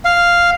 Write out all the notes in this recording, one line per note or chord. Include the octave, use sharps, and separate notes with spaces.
F5